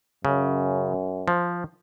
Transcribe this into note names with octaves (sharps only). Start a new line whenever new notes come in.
F#2 C#3
F3